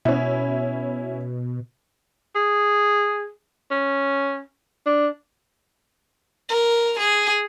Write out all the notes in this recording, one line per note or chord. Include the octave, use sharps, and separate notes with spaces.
B2 C#4 E4
G#4
C#4
D4
A#4
G#4